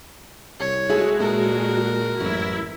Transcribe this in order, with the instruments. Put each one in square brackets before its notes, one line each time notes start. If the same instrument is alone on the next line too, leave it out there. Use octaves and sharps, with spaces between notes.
[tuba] C2 [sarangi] C#5
[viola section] G#3 F#4 [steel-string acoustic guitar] E4 G#4 A4
[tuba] A#2 [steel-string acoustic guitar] A4 [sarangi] A#4
[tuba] A1 [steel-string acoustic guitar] F#2 [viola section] E4